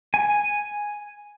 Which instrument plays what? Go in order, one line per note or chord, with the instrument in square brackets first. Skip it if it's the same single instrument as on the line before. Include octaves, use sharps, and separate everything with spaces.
[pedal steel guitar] G#5